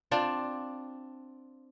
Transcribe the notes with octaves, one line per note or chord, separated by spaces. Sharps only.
C4 D4 F4